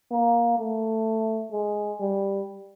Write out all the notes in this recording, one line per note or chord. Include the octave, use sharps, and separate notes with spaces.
A#3
A3
G#3
G3